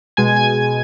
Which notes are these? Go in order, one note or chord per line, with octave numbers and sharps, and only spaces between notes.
B2 G#3 G#5 G#6
G#5 G#6